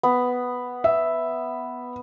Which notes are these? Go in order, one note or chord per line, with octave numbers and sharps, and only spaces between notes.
B3
E5